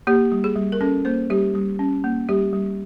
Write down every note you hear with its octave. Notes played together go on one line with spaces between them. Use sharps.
A#3 G4
G3
G#4
G3
A#4
C#4 A4
A#3 C5
G3 G4
G3
C#4
A#3
G3 G4
G3